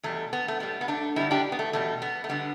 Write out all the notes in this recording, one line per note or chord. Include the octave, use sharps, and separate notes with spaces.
E2 B2 G3 A3
B3
A3
A2 G3 B3
B3
A3 D4
G2 D3 G3 B3 E4
D4 G4
B3
A3
E2 B2 G3 A3
B3
A3
D3 G3 B3